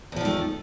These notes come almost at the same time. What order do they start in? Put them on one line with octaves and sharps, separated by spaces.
E2 F3 D#3 A3